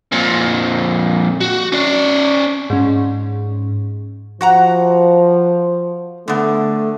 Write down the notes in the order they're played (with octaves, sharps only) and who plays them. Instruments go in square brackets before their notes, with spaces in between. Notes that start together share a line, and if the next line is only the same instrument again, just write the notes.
[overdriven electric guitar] F2 A#2
F#4
C#4 D5
[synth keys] G#2 C#4
[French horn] F3 [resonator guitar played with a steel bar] F#4 F#5 A#5
[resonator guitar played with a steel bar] D3 B3 [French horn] A3